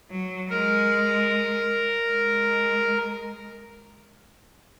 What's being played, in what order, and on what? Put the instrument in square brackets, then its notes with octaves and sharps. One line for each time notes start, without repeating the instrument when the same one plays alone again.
[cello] F#3
[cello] G#3 [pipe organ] A#4
[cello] G#3